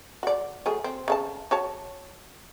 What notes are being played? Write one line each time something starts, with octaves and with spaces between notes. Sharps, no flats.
F#4 D5
F#3 A3 G#4
C4
C#3 D#4 A5
F#4 C#5 A5